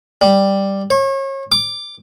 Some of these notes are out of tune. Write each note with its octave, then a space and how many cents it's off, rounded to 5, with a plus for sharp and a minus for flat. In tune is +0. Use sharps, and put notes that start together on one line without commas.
G3 +0
C#5 -35
D6 +10